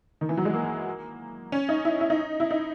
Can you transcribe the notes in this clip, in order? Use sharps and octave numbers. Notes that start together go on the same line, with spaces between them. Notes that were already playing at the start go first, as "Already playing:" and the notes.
D#3
E3
F#3
G#3
A#3
C#4
D#4
E4
E4
D#4
E4
D#4